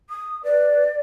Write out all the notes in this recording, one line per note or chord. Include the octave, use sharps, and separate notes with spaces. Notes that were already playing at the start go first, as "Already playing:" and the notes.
D#6
B4 D5